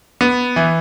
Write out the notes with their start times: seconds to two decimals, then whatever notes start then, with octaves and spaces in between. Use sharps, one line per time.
0.21 B3
0.56 E3